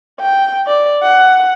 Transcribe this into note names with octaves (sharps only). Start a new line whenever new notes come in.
G5
D5
F#5